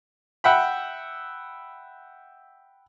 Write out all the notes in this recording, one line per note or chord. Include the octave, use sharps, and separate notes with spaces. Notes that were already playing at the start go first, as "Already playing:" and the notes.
E5 F#5 G5 B5